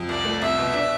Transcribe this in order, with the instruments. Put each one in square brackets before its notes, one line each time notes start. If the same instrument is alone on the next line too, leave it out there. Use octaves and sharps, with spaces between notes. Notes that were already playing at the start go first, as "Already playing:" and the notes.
Already playing: [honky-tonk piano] F2
[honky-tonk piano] C2 [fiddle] D5
[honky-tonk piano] A3
[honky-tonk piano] C2 [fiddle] E5
[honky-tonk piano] B2
D4